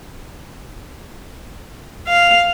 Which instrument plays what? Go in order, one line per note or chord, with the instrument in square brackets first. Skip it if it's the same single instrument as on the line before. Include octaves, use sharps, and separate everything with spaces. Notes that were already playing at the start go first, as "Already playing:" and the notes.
[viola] F5